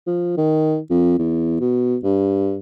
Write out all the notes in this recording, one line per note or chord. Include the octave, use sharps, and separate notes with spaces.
F3
D#3
F2
E2
B2
G2